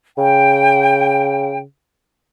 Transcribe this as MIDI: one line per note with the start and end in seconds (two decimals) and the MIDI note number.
0.18 1.63 49
0.18 1.58 79